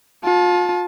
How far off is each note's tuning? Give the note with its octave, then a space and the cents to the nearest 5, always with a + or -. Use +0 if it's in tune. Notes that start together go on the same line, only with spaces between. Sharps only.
F4 +35 A5 -20